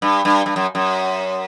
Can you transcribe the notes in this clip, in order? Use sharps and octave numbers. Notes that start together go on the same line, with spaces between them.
G2
G2
G2
F#2
F#2